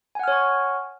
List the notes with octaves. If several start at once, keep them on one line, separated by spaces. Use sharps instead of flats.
C#5 F#5 G#5 C#6 F6